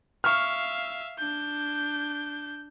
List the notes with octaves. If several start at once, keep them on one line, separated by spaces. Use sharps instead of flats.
E5 F5 C#6 F6
D4 G6